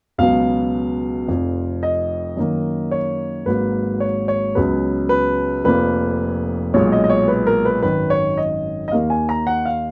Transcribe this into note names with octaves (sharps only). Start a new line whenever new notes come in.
C#2 B2 F#3 B3 F5
F1 F2 F3
D#5
F#2 D#3 A#3
C#5
G#1 G#2 F#3 A#3 B4
C#5
C#5
C#2 C#3 F#3 B3 B4
B4
F1 F2 F3 A#3 B4
B1 A#2 G#3 C#5
D#5
D#5
C#5
B4
A#4
B4
G#1 F#2 D#3 B4
C#5
D#5
D#5
D#2 D#3 A#3 F5
G#5
A#5
F#5
F5